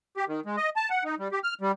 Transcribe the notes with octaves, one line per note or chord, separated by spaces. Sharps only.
G4
D#3
G#3
D#5
A5
F#5
D#4
G3
G4
F6
G3